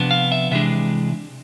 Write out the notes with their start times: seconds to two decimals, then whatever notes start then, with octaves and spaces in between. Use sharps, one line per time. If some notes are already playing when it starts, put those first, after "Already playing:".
Already playing: C3 F3 B3 D4
0.11 F5
0.32 E5
0.51 C3 E3 G#3 D4 E5